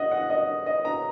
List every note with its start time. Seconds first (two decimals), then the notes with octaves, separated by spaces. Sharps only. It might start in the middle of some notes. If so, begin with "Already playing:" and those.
Already playing: D#5 F#5
0.11 F#5
0.30 D#5
0.66 D#5
0.85 A#5